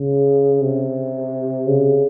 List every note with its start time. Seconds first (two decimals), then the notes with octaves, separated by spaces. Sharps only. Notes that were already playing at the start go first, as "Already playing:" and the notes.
Already playing: C#3
0.61 C3
1.67 C#3